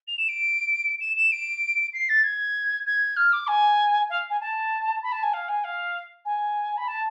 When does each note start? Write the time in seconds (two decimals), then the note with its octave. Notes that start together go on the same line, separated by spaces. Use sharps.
0.07 F7
0.18 E7
0.28 D7
1.00 E7
1.16 E7
1.31 D7
1.93 C7
2.09 A6
2.23 G#6
2.86 G#6
3.16 F6
3.32 D6
3.47 G#5
4.09 F5
4.30 G#5
4.40 A5
5.02 B5
5.12 A5
5.23 G#5
5.33 F5
5.48 G#5
5.64 F5
6.25 G#5
6.77 B5
6.87 A5